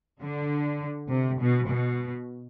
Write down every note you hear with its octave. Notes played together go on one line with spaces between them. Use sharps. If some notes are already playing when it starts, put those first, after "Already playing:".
D3
C3
B2
B2